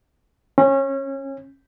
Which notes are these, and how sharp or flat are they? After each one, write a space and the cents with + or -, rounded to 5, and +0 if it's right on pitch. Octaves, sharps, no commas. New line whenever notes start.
C#4 -25